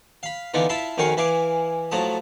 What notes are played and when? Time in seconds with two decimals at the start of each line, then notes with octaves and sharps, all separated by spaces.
0.23 F5 B5
0.54 D3 E3 B3 D#4 F4
0.69 E4 F4 E5 A5 B5 C6
0.98 F2 D#3 C#4 F#4 F5 C#6
1.17 E3 E4 F5 G#5 D6
1.91 A2 F3 F#3 A5 D#6